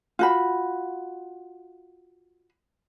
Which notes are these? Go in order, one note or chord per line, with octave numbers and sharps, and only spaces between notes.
F4 F#4 B5